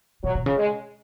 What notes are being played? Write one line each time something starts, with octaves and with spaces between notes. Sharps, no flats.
B2 F#3
B2
C#3
G#3